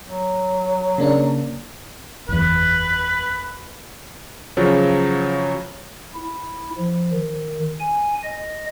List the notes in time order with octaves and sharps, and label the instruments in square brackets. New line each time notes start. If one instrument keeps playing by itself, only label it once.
[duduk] F#3
[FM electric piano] C#3 A#3 D4
[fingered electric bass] F#1 E2 [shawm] B4
[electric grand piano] C#3 F3 F#3
[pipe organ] E4
F3
D#3
G#5
D#5